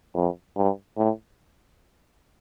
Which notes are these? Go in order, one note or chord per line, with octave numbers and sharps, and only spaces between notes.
F2
G2
A2